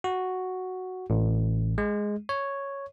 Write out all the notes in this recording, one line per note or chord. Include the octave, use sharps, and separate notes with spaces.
F#4
A1
G#3
C#5